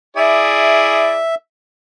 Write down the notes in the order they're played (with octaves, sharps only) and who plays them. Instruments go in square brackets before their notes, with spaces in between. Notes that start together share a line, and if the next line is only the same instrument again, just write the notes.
[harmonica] E4 G#4 D5 [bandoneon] E5